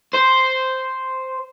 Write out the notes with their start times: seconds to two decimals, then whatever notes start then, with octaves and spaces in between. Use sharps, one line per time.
0.14 C5